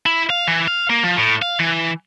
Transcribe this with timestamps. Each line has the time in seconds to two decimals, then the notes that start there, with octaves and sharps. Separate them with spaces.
0.06 E4
0.30 F5
0.48 E3
0.68 F5
0.90 A#3
1.03 F3
1.17 A2
1.42 F5
1.60 E3